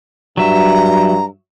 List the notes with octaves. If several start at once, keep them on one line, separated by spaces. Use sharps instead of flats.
G2 F#3 E5 A#5